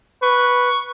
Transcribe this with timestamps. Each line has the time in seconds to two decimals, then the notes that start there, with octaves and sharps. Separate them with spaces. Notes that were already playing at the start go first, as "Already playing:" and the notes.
0.23 B4 C#6